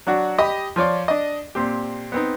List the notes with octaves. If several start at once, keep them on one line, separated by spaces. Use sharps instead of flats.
F#3 D4 F#4
G4 D#5 B5
F3 F4 C#5 D5
D4 D#5
A#2 C4 G4
B3 C4 D#4